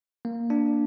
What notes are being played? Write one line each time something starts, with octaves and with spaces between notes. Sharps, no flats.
A#3
D4